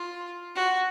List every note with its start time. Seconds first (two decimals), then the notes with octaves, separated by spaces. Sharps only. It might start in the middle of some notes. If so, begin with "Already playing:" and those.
Already playing: F4
0.56 F#4